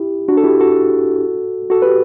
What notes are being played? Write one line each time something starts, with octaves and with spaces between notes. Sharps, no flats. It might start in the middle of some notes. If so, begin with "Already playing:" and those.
Already playing: E4 G4
D4 F#4
A4
E4 G4
F#4 A4
F#4 A4
G4 B4